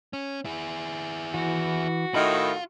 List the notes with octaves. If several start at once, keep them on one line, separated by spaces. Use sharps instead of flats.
C#4
E4 G#4
E3 F#4
A2 D#3 F4 E5 A5 B5